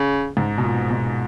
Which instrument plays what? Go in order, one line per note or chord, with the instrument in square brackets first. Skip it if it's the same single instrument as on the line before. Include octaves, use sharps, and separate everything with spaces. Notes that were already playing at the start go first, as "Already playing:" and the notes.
Already playing: [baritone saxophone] C#3
[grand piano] G#2
B2
A#2
B2